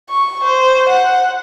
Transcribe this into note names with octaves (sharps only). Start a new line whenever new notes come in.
C#6
C5
F#5